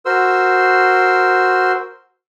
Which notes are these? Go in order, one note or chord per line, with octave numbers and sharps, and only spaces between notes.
F#4 A#4 C5 C6 E6